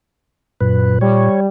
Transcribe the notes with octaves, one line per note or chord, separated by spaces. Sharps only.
F#2 A#2 B4
G3 C#5